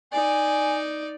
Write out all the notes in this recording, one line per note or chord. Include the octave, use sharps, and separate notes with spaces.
D#4 D5 G#5